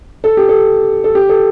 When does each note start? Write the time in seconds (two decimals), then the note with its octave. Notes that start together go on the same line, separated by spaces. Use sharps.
0.24 A4
0.37 G4
0.49 A4
1.04 A4
1.15 G4
1.29 A4